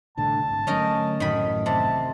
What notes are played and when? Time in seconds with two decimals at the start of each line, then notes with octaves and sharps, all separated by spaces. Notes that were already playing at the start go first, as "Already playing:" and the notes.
0.17 C2 A2 D3 A5
0.50 G#1
0.67 D3 F#3 A3 C#4 D#4 A#4
1.20 A1 F#2 A2 D#3 B5
1.66 C3 A5